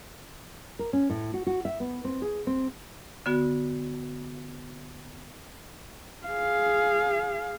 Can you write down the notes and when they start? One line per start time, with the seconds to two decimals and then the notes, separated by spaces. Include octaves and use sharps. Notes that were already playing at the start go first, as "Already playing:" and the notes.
0.79 A#4
0.93 C#4
1.10 A2
1.34 F#4
1.47 F#4
1.65 E5
1.80 B3
2.04 C4
2.22 G#4
2.47 C4
3.26 D3 B3 F#4
6.27 G#4 F5